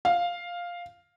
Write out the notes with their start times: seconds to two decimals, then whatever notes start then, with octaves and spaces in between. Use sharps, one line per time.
0.05 F5